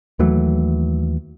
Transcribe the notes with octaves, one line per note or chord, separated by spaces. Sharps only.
D#2 E3 F#3 A3